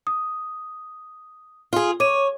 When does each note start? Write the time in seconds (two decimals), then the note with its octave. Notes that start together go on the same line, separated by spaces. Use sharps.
0.07 D#6
1.73 F4 G#4
2.00 C#5 D6 D#7